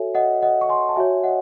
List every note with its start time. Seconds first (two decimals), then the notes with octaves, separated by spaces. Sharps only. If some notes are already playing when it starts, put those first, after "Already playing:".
Already playing: F#4 A4 C#5 E5 G#5
0.15 D#5 F#5
0.42 D#5 F#5
0.61 C#6
0.69 G#5 C6
0.89 A5
0.96 F#4 C#5 E5 G#5
1.24 D#5 F#5